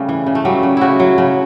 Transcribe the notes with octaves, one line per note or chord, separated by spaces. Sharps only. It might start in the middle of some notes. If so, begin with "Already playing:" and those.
Already playing: C#3 G3 A3
E3
C#3
A3
F#3 G3
C#3
C#3 E4 F#4
F#3
C#3